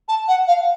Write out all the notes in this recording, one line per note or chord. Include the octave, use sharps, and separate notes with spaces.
A5
F#5
F5